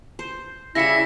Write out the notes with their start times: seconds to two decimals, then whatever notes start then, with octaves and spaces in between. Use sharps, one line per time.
0.19 C5
0.75 C#3 G3 E4 E5 A#6 C#7